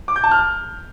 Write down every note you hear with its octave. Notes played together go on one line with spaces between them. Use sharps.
D6
G6
A5
F6